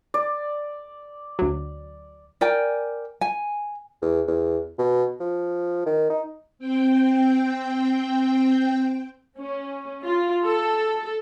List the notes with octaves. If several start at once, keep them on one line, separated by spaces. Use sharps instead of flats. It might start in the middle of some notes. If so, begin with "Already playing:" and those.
D5
D2 F#3
A#4 D5 G5 G#5
G#5
E2
E2
B2
F3
D#3
D#4
C4 G5
C#4
F4
A4